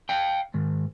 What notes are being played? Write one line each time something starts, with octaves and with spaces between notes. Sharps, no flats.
F5 G5
G#2 D#3